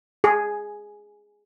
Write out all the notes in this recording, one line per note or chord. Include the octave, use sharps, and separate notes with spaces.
G#4